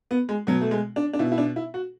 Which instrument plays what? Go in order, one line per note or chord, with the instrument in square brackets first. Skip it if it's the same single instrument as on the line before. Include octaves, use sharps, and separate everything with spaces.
[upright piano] B3
G#3
B2 F#3
A3
G#3
D4
D4
B2 E4
E4
D4
E4
F#4